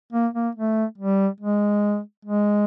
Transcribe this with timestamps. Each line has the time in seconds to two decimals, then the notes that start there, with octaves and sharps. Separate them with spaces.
0.12 A#3
0.34 A#3
0.55 A3
0.98 G3
1.40 G#3
2.25 G#3